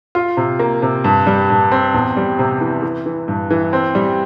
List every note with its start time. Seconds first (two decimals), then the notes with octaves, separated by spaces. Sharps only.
0.15 F4
0.37 C3
0.59 A#3
0.82 C3
1.04 G2
1.27 G3
1.50 G2
1.72 C4
1.94 E2
2.17 G3
2.39 C3
2.61 E3
2.82 E3
3.06 E3
3.28 G2
3.51 E3
3.73 C4
3.95 G3